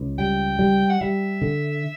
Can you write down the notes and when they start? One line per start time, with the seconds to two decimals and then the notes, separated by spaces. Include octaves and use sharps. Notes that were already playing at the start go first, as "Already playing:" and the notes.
Already playing: C#2
0.18 G3 G5
0.59 G3
0.90 F#5
1.01 G3 E5
1.41 D3